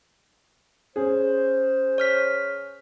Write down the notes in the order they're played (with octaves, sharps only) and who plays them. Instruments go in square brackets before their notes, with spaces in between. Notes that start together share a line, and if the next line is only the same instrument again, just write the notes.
[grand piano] C#4 G#4 [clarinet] C5
[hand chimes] C#5 F6 B6